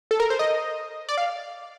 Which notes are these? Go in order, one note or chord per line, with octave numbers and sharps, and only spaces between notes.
A4
A#4
C5
D#5
D5
F5